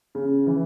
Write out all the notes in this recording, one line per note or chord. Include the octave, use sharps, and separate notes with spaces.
C#3
E3